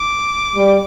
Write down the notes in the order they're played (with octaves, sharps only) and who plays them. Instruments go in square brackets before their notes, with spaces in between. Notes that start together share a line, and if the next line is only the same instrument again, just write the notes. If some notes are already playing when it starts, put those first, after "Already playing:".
Already playing: [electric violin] D6
[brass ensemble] G3